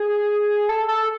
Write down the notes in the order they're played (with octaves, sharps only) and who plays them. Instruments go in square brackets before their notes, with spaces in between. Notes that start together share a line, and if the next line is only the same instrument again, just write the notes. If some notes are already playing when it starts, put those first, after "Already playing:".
Already playing: [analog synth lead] G#4
A4
A4